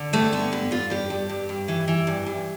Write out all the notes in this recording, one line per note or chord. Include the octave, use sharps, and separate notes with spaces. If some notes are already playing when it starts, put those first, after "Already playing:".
Already playing: D3
G2 A3
D3 B3
G2 B3
G2 F4
G2 G4
G2
G2
G2
E3
E3
G2
G2